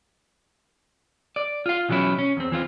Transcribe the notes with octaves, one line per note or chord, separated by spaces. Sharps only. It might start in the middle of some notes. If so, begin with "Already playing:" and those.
D5
F4 F5
B2 E3 F#3 C#4 E4
C#4
E2 C4
E3 C4 F4